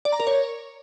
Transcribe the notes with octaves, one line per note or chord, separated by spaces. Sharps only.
D5
A#5
A#4
C#5